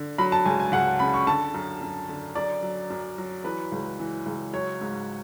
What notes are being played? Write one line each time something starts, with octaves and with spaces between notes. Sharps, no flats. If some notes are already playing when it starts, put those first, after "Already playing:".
Already playing: D3
F#3 B5
A5
C#2 G#5
G#5
C#2 F#5
C#3 B5
C#6
D3 A5
F#2
F#2
D3
F#2 D5
F#3
F#2
F#3
E3 B4
C#2
E3
C#2
F#3 C#5
G#2